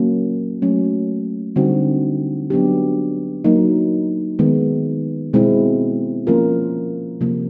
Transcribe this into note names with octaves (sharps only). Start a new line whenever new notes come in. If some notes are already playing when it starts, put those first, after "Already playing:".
Already playing: F#3 A#3 C#4
F#3 A3 C#4
D3 G3 C4 D#4 F#4
F#3 B3 D4 G4
F#3 A#3 D#4
D#3 G#3 B3
B2 G#3 C4 E4
F3 A#3 C#4 F4 A#4
C3 F3 A#3